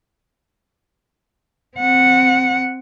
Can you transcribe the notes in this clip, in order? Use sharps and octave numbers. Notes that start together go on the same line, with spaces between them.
C4 F#5